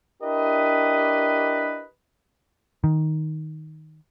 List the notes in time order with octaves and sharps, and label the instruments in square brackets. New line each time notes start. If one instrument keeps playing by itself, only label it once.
[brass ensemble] D4 E4 G4 A#4 B4 D#5
[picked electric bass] D#3